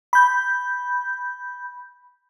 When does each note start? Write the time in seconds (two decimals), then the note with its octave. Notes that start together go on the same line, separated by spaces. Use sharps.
0.13 B5 G6